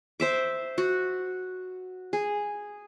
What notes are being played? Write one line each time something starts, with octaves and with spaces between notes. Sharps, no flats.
C5 E5 D6
F#4
G#4